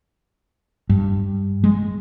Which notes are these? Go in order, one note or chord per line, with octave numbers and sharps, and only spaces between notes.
G2
G#3